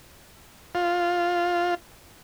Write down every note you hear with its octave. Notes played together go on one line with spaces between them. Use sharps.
F4